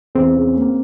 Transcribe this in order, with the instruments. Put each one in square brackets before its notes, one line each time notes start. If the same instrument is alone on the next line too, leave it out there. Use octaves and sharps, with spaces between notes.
[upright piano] E2 [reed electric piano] C4
[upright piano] C#3
A#3